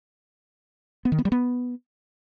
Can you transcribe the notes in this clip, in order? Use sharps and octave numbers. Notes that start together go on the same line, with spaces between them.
B3
D#3
B3
G3
B3